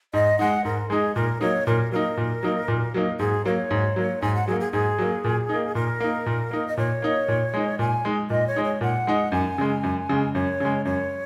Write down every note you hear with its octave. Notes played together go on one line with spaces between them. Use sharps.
G#2 D#5
G#3 D#4 F#5
G#2 A#4
G#3 D#4 G#4
A#2 A#4
F#3 A#3 D#4 C#5
A#2 A#4
F#3 A#3 D#4 A#4
A#2
F#3 A#3 D#4
A#2
F#3 A#3 D#4
G#2 G#4
F#3 A#3 C#5
G#2
F#3 A#3
G#2 G#5
F#5
F#3 A#3 G#4
G#4
G#2 G#4
F#3 A#3
A#2
A#3 D#4
A#2 A#4
A#3 D#4
A#2
A#3 D#4
D#5
A#2 C#5
A#3 D#4
A#2
G#3 D#4
A#2 G#5
G#3 D#4
A#2 D#5
C#5
G#3 D#4
C#5
A#2 F#5
G#3 D#4
F#2 G#5
C#3 G#3
F#2
C#3 G#3
F#2 C#5
C#3 G#3
F#2 C#5